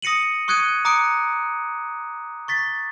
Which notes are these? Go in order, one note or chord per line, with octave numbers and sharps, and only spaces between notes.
D#6 A#6 C#7 D#7 F#7
C#6 D#6 F#6 G#6 C#7 D#7
A#5 D6 D#6 F#6 C#7 D7
C#6 A6 B6